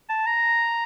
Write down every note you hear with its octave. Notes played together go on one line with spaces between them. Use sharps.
A5
A#5